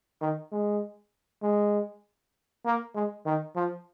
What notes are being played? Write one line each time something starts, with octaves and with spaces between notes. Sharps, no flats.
D#3
G#3
G#3
A#3
G#3
D#3
F3